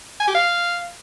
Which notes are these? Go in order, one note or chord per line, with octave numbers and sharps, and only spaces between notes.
G#5
G4
F5